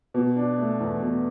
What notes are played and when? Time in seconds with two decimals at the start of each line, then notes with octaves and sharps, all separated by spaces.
0.14 B2
0.36 D4
0.58 A3
0.80 E2
1.02 B2